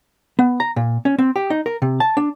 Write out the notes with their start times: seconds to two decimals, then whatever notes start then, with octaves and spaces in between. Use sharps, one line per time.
0.39 B3
0.60 A#5
0.76 A#2
1.05 C#4
1.18 C4
1.36 G4
1.50 D#4
1.66 A#4
1.82 C3
2.00 A5
2.17 D4